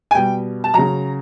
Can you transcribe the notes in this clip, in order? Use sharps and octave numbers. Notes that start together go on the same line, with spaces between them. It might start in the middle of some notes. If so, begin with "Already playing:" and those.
G#5
B2 G3 G5
A5
C#3 F#3 A#5